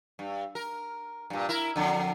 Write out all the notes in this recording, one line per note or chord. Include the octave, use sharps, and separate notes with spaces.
G2
A#4
G2 A#2
E4 A#4
F2 D3